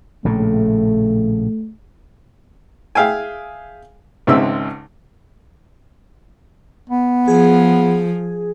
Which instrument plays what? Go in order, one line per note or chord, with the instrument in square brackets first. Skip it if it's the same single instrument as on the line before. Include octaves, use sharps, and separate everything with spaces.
[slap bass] A#1 A2 C#3 [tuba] A3
[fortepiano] G#4 E5 F5 G5 G#5
G#1 C#2 G#3 C4 E5 E6
[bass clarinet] B3
[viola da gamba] F3 [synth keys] G#4